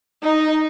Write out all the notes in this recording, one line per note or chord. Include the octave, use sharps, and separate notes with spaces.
D#4